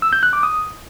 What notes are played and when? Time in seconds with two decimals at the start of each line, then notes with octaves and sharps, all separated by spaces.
0.02 E6
0.13 G6
0.23 F#6
0.33 D6
0.43 D#6